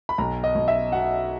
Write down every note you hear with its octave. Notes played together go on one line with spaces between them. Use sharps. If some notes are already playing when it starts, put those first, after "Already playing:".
B5
B1 A#5
D#5
B1
E5
B2 F#5